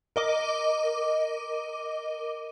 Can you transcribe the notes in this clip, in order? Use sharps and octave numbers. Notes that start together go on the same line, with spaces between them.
A#4 D#5 D6